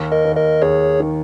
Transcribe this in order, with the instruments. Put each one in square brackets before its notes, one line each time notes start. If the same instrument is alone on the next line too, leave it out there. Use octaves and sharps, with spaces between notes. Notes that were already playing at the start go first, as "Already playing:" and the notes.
Already playing: [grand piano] D#2
[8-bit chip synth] A#4 D#5
[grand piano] D#2
[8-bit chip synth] A#4 D#5
[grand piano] D#2 [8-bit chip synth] G#4 C#5
[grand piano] D#3